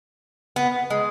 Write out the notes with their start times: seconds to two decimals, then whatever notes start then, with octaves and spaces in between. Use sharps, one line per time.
0.56 B3
0.90 G#3